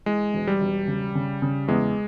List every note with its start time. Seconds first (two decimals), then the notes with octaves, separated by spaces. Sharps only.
0.06 E3 G#3
0.33 E1
0.47 G3
0.61 E1
0.87 C#3
1.15 C#3
1.42 C#3
1.68 E2 G#3